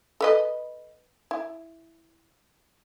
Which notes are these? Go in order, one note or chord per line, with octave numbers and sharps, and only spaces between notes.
A4 B4 D#5
E4